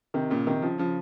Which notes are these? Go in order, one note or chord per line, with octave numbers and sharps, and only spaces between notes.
C3 D#3
A#2 C#3
C3 D#3
C#3 F3
C#3 F3